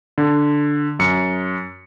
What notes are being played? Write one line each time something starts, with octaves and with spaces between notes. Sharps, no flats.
D3
F#2 C#7